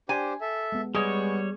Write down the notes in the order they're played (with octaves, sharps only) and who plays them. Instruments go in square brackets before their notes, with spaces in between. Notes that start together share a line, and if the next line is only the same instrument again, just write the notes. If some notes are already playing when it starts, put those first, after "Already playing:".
[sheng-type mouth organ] D4 G4 C5 [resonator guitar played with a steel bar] G#5
[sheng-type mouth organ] A4 E5
[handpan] G#3 B3
[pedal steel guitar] G3 C#5 [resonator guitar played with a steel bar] G#3 [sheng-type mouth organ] B3 C#6 [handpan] G#4